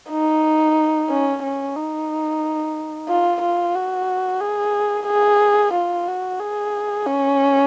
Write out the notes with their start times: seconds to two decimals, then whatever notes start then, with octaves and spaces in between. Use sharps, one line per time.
0.10 D#4
1.09 C#4
1.43 C#4
1.76 D#4
3.09 F4
3.42 F4
3.75 F#4
4.40 G#4
5.07 G#4
5.73 F4
6.07 F#4
6.39 G#4
7.06 C#4